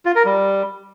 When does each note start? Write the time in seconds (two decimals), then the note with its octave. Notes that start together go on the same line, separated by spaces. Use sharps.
0.06 F4
0.16 A#4
0.25 G3